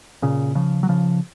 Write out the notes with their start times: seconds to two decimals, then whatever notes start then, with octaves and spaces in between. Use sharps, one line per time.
0.22 A#2 C#3
0.55 C#3 F3
0.83 F#3
0.89 C#3 F3